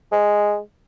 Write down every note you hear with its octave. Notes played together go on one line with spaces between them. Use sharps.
G#3